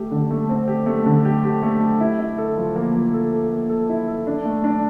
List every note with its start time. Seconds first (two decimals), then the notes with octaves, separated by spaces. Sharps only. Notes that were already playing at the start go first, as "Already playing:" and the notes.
Already playing: A3 G4
0.11 D3
0.31 A3
0.49 C4
0.68 G4
0.86 A3
1.06 D3
1.25 G4
1.44 G4
1.63 A3
1.81 G4
2.00 E4
2.19 E4
2.38 A4
2.57 F3
2.76 A#3
2.95 F3
3.14 A4
3.33 A4
3.51 A#3
3.69 A4
3.89 E4
4.08 A4
4.27 D4
4.45 A3
4.64 D4